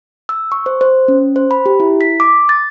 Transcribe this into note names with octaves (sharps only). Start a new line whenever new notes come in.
E6
C#6
C5
C5
C#4
C5
B5
G4
E4
B6
D6
A6